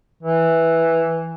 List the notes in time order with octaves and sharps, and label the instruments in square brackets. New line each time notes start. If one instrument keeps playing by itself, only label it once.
[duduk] E3